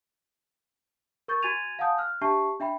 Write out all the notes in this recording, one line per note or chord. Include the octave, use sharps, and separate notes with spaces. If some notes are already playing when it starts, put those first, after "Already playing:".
A#4 C#6 G6 A6
F#4 G#5 G#6 A6 D#7 F7
F5 F#5 G#5 A5 D#6 G6
F6 F#6
D4 G4 E5 A5 C#6 C7
D4 E5 G5 B5